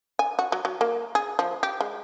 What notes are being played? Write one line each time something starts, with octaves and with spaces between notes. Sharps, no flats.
G#5
F#4
F#3
F#3
A#3
G#4
F3
G4
G#3